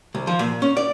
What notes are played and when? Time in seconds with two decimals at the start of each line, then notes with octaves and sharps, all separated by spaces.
0.14 C2
0.27 F3
0.39 A#2
0.62 C#4
0.77 D5